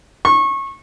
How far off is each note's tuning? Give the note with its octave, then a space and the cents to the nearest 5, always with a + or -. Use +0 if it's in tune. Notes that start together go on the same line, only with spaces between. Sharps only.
C#6 -25